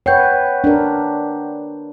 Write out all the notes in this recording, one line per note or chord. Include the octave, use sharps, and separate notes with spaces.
B4 C#5 F#5 G5 G6
D4 A#4